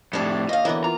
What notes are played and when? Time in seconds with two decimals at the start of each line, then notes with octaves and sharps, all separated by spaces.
0.13 F2 A2 G3 D4 A5
0.49 D#2 D#5 F5
0.65 D3 E3 F#3 A#3 B3
0.84 F4 A#5